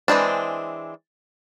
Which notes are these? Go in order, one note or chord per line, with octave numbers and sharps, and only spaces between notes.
E3 G#3 C4 D4